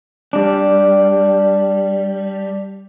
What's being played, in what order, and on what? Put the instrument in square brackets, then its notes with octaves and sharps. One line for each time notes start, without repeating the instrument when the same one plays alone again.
[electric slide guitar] G3 D4